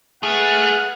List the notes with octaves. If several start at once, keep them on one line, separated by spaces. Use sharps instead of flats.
A3 G#4 B4 F#5 F6